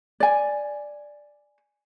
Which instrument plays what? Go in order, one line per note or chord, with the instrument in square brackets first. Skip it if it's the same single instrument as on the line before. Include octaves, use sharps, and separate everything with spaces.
[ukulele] D5 G#5